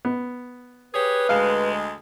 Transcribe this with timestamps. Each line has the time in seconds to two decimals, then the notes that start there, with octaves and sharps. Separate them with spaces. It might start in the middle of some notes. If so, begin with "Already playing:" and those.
0.05 B3
0.94 G4 G#4 B4 C#5
1.29 D2 G#3 F5